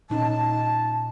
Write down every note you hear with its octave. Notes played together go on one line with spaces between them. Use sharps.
A#2 C#4 D#4 A5